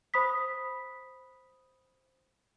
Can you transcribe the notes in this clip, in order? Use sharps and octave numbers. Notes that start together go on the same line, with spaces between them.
C5 B5 D#6 B6